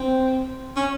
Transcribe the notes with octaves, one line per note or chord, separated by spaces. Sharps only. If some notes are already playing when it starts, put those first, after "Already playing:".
Already playing: C4
C#4